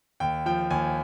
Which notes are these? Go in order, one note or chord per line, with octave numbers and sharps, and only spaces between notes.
D#2 G5
F3 G5
D#2 G#5